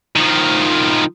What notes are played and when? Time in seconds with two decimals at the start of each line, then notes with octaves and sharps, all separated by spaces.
0.16 D#3 F3